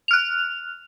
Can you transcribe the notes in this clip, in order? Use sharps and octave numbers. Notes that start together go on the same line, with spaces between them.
F6 F#6 F7